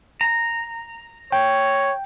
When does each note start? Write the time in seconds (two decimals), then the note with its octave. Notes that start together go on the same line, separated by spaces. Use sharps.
0.21 A#5
1.32 C#5 G5